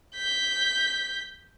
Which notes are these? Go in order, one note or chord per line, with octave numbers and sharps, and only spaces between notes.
G6 B6